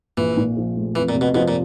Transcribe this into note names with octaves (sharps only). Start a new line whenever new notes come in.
A#1 E3
A#2
F3
A3
F2 E3
A#2
C3
B2
B2 F3
A#2